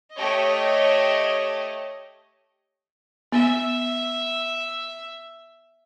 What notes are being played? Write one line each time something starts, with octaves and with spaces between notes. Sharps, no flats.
A3 G4 C#5 D#5
B3 E5